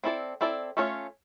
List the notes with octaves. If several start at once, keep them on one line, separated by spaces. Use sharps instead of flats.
C4 E4 A4 D5
C4 E4 A4 D5
A3 C#4 F4 A4 C#5